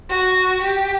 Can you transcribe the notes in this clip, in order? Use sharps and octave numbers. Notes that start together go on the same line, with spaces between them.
F#4
G4